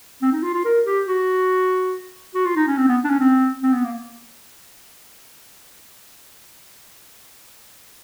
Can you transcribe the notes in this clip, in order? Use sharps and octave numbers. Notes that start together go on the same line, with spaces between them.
C4
D#4
F4
F4
A#4
G4
F#4
F#4
F4
D#4
C#4
C4
B3
D4
C#4
C4
C4
B3
A#3